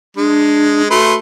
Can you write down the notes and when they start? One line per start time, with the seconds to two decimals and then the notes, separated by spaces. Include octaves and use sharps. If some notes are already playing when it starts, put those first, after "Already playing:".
0.17 G#3 D4
0.90 A3 F#4 B4 C6